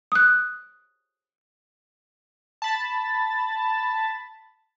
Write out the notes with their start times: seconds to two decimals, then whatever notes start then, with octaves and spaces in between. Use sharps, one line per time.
0.12 D#6 F#6
2.62 A5 B5 A6